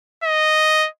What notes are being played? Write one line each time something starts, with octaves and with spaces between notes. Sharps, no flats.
D#5